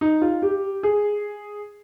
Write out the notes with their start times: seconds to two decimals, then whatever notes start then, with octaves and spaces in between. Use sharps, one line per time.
0.01 D#4
0.22 F4
0.42 G4
0.83 G#4